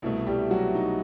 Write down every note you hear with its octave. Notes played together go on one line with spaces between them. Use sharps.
C2 B2 A3 E4
G3 G4
F#3 F#4
D#4